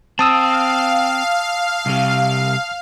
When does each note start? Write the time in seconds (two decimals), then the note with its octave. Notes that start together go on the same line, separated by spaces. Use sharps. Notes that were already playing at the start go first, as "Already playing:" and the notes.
0.19 C4 F5 A5 D#6 E6
1.86 C2 C3